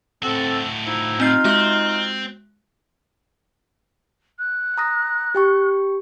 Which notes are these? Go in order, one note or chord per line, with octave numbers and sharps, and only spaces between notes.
A2 C4 F#4 A4
F3 D#4 E4
C4 D#4 F4 G6 C7
G#3 C4 F#4 F#6
F#6
A#5 D#6 A#6
G4 G5 C#6